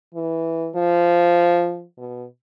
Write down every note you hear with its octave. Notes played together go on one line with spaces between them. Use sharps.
E3
F3
B2